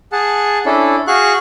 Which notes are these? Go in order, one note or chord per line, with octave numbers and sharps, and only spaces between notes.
G#4 F#5 A5
C#4 D4 E4 A4
F#4 G#4 F5 F#5 C#6 F#6